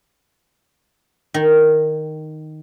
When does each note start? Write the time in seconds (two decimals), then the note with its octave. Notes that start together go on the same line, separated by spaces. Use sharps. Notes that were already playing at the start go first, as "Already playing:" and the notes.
1.34 D#3